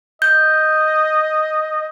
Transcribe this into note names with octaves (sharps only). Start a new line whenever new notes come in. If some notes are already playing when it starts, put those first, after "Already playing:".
D#5 G6